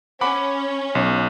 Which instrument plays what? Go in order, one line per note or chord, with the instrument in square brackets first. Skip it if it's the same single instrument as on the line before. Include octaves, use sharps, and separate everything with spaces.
[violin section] C#4 [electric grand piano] F#5 B5 D6
[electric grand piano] B1